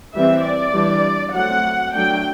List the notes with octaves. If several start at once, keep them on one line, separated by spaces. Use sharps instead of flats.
E3 G3 C4 E5
D5
E3 G3 D4
F#3 A3 C4 F#5
F#3 A3 D4 G5